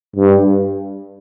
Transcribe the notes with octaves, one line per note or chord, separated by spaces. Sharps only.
G2